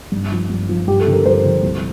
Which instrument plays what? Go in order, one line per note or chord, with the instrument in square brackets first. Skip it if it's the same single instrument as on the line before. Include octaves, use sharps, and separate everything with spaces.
[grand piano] G2
F3
G2
F3
G2 G4
A4
D3 F3
A#4
G2 C5
D3 F3
C2